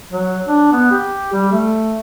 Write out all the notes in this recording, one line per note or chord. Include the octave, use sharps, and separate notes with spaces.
F#3
D4
B3
G4
G3
A3